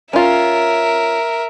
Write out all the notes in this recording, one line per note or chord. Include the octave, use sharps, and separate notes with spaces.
C#4 F4 A#4 E5